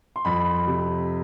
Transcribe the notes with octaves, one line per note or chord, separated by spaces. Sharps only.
C6
F2 B5
C3